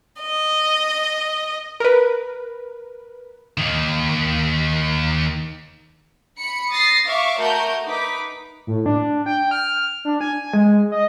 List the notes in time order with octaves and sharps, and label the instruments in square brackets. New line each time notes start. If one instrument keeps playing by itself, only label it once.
[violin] D#5
[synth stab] A#4 B4
[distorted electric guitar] D#2 D#3
[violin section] B5 C#7
D#6 A6 A#6 C7
E5 F5 C#6 D6
A3 F#4 A#4 G6
D#4 B4 D6 B6
[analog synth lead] A2
D4
G5
F6
D4
G#5
G#3
D#5